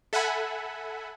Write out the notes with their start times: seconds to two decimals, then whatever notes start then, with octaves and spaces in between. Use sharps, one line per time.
0.13 A4 E5 F#5 G#5 B5